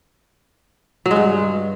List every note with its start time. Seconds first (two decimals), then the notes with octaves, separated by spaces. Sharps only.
1.06 F#3
1.11 G#3
1.16 G2